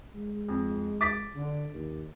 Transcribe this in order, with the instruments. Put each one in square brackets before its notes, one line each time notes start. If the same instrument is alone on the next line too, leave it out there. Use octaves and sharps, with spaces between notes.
[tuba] G#3
[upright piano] F2
D6 A6 B6
[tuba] D3
D#2